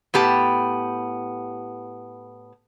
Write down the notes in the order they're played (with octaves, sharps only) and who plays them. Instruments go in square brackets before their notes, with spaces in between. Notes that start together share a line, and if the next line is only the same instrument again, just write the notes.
[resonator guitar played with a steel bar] A2 B3 G4 A5